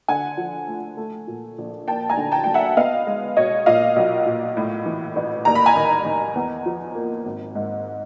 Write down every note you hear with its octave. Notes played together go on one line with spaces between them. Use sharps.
D3 F#5 G#5
F3
A3
A3
A#2
A#1
A#3 G5 A5
G#5 A#5
D3
G5 A5
F#3 G5
E5 F#5
B3 D#5 F5
G#3
B2 C#5 D#5
A#2 D#5 F5
B1
A#2
A2
E3
A1
D#2 A#5
B5
G#5 A#5
D#3
D#3
E2
F3
A#3
G#1
G#2